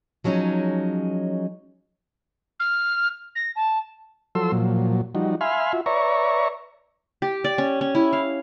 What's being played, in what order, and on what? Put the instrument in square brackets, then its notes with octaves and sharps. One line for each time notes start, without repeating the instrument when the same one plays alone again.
[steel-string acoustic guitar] F3 F#3 G#3 C#4 D#4
[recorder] F6
A#6
A5
[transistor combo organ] F3 F#3 A4 C6 E6
A#2 F3 F#3
F3 G3 D#4 F#4
E5 F5 G#5 B5 C6 F6
F4 F#4 E5
B4 C#5 D5 E5 A#5 C#6
[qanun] G4
D5
C#4
C#4
E4
F5